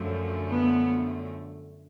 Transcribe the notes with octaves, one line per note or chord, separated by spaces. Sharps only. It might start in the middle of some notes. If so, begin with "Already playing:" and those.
Already playing: F#2 D3 F3 A3
B3